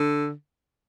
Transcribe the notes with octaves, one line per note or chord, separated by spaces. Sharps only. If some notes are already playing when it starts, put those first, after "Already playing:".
Already playing: D3